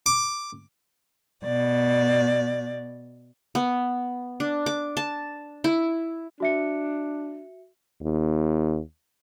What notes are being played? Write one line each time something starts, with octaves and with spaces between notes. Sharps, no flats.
D6
B2 D5
B3
D4
D6
A5
E4
D4 F#4 E5 C#7
D#2